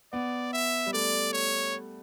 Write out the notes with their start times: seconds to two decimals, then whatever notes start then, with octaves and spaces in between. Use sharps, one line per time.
0.13 B3 D5
0.53 E5
0.86 G3
0.93 A3 D5
1.33 C#5